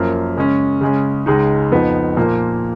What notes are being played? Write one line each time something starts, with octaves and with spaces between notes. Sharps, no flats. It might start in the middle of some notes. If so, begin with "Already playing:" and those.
Already playing: F#2 F3 A#3
C#3 G#3 C#4
C#3 G#3 C#4
C#2 C#3 G#3 D#4
F2 F3 B3 D#4
A#2 F3 A#3